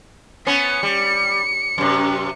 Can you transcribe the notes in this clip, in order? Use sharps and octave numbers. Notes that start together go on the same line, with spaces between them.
B3 C#4 C#7
G3
F#2 C3